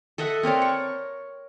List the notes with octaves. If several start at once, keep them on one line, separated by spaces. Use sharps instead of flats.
A4 D#5 E5 F#5
C4 A#4 C#5 D5
C#6